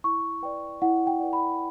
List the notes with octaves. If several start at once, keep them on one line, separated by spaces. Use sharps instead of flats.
E4 C#6
B4 D5 G5
E4 F#5
G5
B4 D5
B5